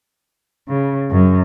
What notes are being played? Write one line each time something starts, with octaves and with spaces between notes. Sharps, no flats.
C#3
F#2